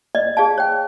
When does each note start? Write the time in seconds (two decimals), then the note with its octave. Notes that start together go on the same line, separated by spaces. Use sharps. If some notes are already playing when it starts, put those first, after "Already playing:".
0.15 D5 D#5
0.37 G#4 D5 F5 A5
0.58 C#5 G5